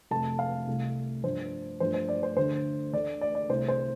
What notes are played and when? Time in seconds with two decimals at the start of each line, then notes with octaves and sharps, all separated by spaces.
0.11 F2 C3 A3 A5
0.39 F5
0.67 C2 C3 A3
1.23 G2 F3 A3 C5
1.80 G2 F3 A3 C5
1.94 C5
2.09 D5
2.23 C5
2.37 D2 D3 A3 C5
2.93 D2 D3 A3 D5
3.21 D5
3.35 D5
3.49 C2 C3 A3 C5
3.68 C5